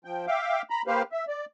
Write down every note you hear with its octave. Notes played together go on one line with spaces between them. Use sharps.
F3 G5
E5 F5 G5 D6
A#5 B5
A#3 G4 B4 C5 F5
E5
D5